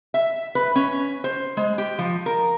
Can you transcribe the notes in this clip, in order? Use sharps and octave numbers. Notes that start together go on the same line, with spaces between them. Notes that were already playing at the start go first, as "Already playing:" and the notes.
E5
B4
C#4
C5
G#3
G4
F3
A#4